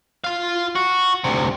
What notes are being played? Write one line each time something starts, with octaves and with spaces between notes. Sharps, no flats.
F4 F5
F#4
D2 C3